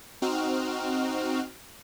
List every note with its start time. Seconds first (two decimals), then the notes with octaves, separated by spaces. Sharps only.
0.22 C4 D#4 F#4 F6